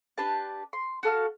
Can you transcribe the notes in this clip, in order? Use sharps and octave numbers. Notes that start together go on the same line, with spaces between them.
D4 G4 B4 A5
C6
F#4 A4 F5 F6